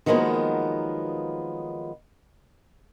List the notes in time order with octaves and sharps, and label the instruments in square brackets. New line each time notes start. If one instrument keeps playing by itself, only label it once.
[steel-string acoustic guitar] D#3 F3 F#3 G#3 A#3 B3